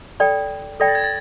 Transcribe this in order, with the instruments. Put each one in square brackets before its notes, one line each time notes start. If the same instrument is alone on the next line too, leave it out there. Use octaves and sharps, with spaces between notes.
[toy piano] A4 D5 G5 B5
[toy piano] A4 D5 G5 B5 [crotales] A#6
[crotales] A6
G#6
A6